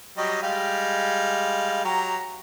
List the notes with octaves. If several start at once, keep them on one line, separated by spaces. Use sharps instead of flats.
F#3 G3 D#5
G3 G#3 F5
F#3 G4 A#5